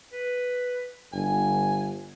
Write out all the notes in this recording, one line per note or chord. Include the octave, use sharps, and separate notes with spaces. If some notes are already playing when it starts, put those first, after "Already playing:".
B4
G1 G#5